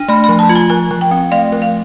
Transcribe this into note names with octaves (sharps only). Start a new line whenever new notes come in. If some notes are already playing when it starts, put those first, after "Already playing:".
Already playing: D4
A3 B5
B5
F3
A5
F4
G#5
F3 G#5
F3
G5
C4
A3 F5
F3
F5